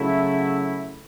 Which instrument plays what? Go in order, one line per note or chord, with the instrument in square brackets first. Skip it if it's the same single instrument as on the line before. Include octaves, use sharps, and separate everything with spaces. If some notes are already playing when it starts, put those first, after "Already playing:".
Already playing: [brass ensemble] C#3 F#3 A3 E4